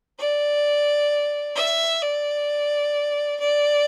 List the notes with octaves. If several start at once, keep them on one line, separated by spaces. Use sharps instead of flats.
D5
E5
D5
D5